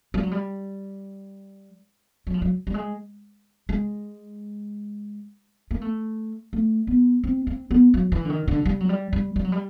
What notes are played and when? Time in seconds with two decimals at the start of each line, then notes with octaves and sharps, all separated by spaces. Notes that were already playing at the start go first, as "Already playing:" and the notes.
0.14 G3
0.23 F#3
0.32 G3
2.27 F#3
2.34 F3
2.42 F#3
2.67 G3
2.74 G#3
3.69 G#3
5.71 A#3
5.81 A3
6.53 A3
6.87 B3
7.24 C4
7.47 C4
7.71 B3
7.94 F#3
8.12 E3
8.25 D3
8.30 D#3
8.48 D3
8.65 G3
8.80 F#3
8.89 G3
9.13 G3
9.36 G3
9.44 F#3
9.52 G3